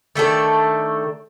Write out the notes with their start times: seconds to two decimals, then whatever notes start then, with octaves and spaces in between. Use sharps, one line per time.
0.16 D#3 A3 D4 A4